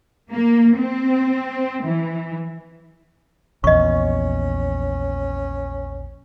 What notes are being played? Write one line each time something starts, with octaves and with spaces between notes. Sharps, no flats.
A#3
C4
E3
A#1 E2 C#4 D#5 C#6